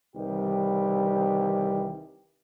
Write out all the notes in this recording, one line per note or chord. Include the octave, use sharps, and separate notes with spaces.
C2 D#3 E3 G3 G4